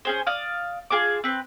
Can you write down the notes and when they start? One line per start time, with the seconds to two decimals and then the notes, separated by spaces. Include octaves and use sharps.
0.05 C#4 G#4 C5
0.27 D5 F5 D#6
0.90 F4 G#4 A5 D6
1.24 C4 B4